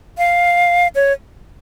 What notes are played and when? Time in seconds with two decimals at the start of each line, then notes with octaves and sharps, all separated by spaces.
0.18 F5
0.95 C#5